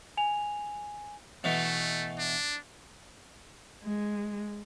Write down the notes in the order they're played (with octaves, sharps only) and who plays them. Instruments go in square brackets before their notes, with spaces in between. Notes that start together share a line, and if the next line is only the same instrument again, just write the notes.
[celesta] G#5 F7
[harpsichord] B2 E3 [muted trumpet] A3
[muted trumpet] D4
[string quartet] G#3